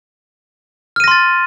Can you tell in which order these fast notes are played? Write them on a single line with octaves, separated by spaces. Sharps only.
F6 D#7 A#6 C6 A6